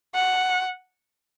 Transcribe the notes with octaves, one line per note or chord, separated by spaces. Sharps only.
F#5